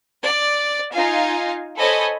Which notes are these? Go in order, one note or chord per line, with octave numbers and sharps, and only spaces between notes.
D5
D#4 F4 F5 G#5
A4 C5 C#5 D#5 G#5 B5